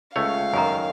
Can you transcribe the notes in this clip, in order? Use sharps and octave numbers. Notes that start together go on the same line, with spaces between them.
C#2 A3 C#5 F5
F#2 D#3 G#5 A#5